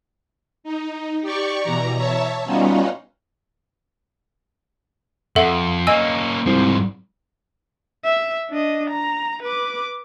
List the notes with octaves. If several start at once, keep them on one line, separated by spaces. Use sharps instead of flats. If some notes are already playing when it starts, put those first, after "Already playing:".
D#4
G4 D5 C#6
B2 E3 A#5
C#5 E5 A5
G3 B3 C#4 D#4 F4 F#4
F2 A4 E5 F#5
A#3 C#4 D#5 G#5 E6
C2 G#2 F3
E5
D4 D#5
A#5
B4 D6